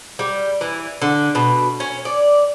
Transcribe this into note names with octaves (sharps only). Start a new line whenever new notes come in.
G3
E3
D3
B2
C#4
D5